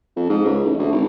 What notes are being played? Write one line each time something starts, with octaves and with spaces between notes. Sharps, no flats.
F2
G#2
C#2
A1
D2
G#1